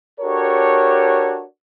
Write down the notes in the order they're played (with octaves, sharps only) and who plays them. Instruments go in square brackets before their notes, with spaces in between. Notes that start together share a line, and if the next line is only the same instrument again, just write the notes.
[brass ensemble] D4 F#4 G4 A4 A#4 C#5